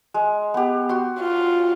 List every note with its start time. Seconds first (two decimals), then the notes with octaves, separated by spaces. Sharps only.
0.14 G#3
0.54 B3 G4
0.89 F#4 G5 C6
1.21 F4